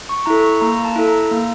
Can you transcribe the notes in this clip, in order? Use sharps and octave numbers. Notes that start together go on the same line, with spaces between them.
C#6
E4 A4 A#5
C#6
A#3 A#5
A5
E4 A4
A#5
A#3